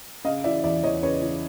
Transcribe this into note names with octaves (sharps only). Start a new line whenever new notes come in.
C#3 D#5 F5
E3 D5 E5
E2 D5 E5
E2 C#5 D#5
C#3 B4 C#5
E3